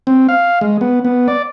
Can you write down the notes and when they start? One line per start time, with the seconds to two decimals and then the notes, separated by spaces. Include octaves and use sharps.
0.07 C4
0.29 F5
0.61 G#3
0.81 B3
1.05 B3
1.28 D5